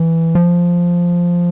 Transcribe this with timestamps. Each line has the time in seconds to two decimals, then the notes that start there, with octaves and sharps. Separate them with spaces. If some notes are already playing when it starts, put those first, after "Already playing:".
Already playing: E3
0.35 F3